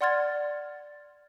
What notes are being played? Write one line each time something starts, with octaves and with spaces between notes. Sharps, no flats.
D5 F#5 C6 F6 G#6 A6